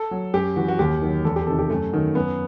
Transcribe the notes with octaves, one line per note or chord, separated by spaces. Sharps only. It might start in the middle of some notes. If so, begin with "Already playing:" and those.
Already playing: A4
F#3
F#2 G4
E3 F#4
F#4
D#2 G4
D#3 F#3
E2 A4
G4
C3 D#3 A4
G4
F#2 A3
D#3 F#3
F#2 B3